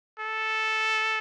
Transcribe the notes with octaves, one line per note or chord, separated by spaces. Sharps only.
A4